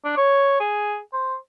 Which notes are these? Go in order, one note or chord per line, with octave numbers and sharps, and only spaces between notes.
D4
C#5
G#4
C5